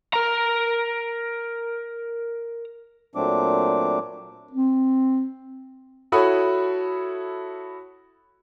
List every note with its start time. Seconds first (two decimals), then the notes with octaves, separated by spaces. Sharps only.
0.14 A#4 A#5
3.15 A#2 F#3 A3 C4 D4 D6
4.51 C4
6.12 E4 F#4 A4 C#5 B5 D#6